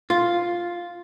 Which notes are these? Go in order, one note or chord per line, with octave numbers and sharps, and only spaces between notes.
F4